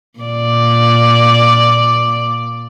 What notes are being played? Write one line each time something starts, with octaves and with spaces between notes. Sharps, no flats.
A#2 D5